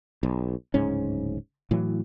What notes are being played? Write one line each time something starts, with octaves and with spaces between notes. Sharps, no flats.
B1
D1 G#2 C#3 C#4
A2 E3 F#3